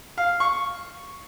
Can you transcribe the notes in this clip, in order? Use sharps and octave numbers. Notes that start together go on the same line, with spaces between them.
F5
C#6